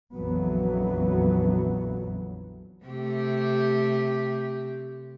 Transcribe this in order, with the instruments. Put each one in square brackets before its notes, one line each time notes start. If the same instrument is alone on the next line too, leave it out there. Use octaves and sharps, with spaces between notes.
[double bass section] A#1 F2 E3 F#3 B3
[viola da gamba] C3 A3 G4